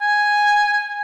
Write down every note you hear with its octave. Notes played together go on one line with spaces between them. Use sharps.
G#5